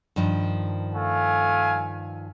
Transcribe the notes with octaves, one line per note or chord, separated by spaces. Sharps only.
G2 D#3 F3
A3 F5 G#5